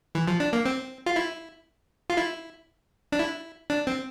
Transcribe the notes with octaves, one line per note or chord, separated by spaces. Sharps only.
E3
F3
D4
A#3
C4
F4
E4
F4
E4
D4
E4
D4
C4